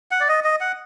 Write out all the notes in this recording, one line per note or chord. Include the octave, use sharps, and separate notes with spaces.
F#5
D5
D#5
D#5
F#5